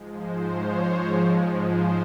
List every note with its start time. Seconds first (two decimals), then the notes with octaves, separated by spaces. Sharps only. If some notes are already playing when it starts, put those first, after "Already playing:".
Already playing: G#2 F3 G#3
0.17 C5
0.47 C#5
1.07 G#2 F3 G#3
1.68 C5